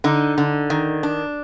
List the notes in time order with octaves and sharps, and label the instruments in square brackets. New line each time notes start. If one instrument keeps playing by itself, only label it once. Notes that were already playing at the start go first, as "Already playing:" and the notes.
[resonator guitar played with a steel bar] D3 D#4
D3
D#3
D4